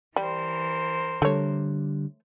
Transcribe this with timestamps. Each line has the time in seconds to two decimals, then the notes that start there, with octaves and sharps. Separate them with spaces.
0.16 E3 G3 A#4 C5
1.22 D3 G3 A3 C#5